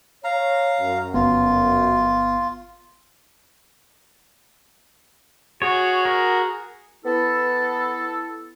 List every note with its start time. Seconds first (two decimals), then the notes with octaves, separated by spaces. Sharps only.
0.24 C#5 F5 A#5
0.80 F#2
1.14 G1 B3 F4
5.62 F#4 G#4 C#5
6.05 A#4
7.05 B3 E4 A4